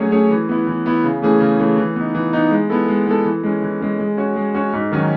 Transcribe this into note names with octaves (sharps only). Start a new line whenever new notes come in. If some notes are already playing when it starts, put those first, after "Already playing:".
Already playing: F#3 A3 C#4 G#4 C#5
A3 C#4 G#4 C#5
E3
B3 E4
E3
B3 E4
C#3
E3 A3 C#4 G#4
C#3
E3 A3 C#4 G#4
E3
B3 D#4
E3
B3 D#4
G#3
B3 E4 A4
G#3
B3 E4 A4
E3
G#3 C#4
E3
G#3 C#4
G#3
C#4 F#4 C#5
G#3
C#4 F#4 C#5
G#2
D#3 F#3 C#4